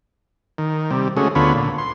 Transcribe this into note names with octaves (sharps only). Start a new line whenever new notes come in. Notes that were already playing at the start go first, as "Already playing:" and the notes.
D#3
C3 G3
C#3 G#3 A3 C#4 F#4 G#4
D2 D3 B3 F4 C#5 B5
A#2 D3
C6